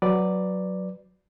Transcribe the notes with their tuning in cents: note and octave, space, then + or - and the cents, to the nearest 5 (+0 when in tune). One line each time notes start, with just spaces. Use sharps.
F#3 +0 B4 +0 D5 +0